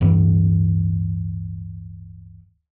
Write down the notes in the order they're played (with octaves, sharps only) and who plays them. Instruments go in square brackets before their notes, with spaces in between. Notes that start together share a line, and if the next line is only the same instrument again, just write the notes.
[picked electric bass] D1 G2 E3